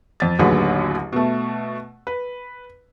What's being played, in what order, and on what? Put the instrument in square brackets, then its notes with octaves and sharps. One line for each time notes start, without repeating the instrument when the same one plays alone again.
[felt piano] F2 A6
A1 D#2 D3 F#3 G#4 B4
B2 A3
B4